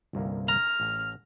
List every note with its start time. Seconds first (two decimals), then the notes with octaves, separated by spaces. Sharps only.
0.13 G1 C2 A#3
0.48 A#5 F6
0.80 A1